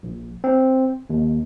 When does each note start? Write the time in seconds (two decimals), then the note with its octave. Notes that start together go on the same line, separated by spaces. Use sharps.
0.03 A#1
0.44 C4
1.10 D#2